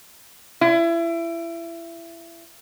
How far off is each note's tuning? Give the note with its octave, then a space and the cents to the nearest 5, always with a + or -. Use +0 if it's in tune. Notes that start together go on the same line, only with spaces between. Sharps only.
E4 +25